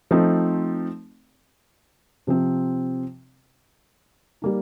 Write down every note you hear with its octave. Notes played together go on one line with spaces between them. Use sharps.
F3 A3 C4 D#4
C3 F3 C4
G3 A#3 D#4